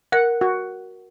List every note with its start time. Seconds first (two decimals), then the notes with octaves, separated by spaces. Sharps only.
0.12 A#4 F#5
0.41 F#4